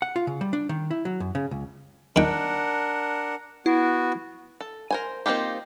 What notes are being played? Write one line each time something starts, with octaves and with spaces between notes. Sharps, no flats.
F#5
F4
C#3
G3
D4
D#3
E4
F#3
F#2
C#3
C#2
D#3 D4 A#4 F#5 G5
B3 E4 F#4
A4
A#4 C5 G#5
A#3 C4 D#4 F4 G4